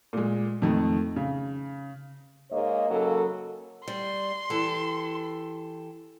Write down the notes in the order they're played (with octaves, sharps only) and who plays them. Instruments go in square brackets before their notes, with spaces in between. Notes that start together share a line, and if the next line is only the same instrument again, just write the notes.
[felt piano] A#2 G#3
F2 D#3 A3
C#3
[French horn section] G#2 A#3 C#5 D#5
C#3 F#3 A#3 A4
[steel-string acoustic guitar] G3 [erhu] C6
[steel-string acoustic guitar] E3 G4 A4